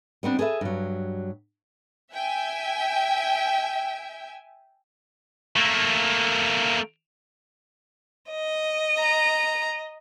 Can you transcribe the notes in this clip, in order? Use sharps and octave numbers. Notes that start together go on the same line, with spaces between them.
G3 B3 C4 D4
G#4 A4 B4 E5
G2 F#3
E5 G5 G#5
A3 A#3
D#5
A#5